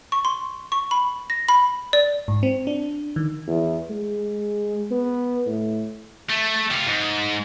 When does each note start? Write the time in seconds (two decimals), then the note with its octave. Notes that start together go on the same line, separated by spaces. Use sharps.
0.12 C#6
0.25 C6
0.72 C#6
0.91 B5
1.30 A#6
1.48 B5
1.93 D5
2.28 G#2
2.43 C4
2.67 D4
3.16 D#3
3.47 E2
3.90 G#3
4.91 B3
5.46 A2
6.29 A3
6.71 C3 F4
6.86 G#2